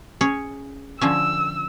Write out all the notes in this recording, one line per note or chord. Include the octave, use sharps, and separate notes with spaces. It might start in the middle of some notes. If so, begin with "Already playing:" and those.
C#4 G#4 C#5
D3 F3 C#4 E6